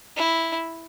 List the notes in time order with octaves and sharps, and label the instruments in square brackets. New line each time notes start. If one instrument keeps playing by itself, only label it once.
[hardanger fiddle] E4